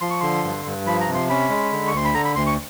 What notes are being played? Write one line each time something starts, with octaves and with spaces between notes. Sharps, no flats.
F3 C6
C#6
D3 C6
G2
G2
F3 B5
A#5
C3
C6
C#4 B5
G#3
D3
C#6
D2 C6
B5
D3 A#5
B5
D2 C6
C#6